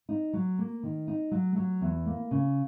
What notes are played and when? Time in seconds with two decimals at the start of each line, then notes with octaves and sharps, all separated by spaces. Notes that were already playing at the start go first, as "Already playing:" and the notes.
0.09 D#4
0.33 F#3
0.59 A#3
0.83 D#3
1.08 D#4
1.31 F#3
1.56 F#3
1.81 E2
2.06 A#3
2.31 C#3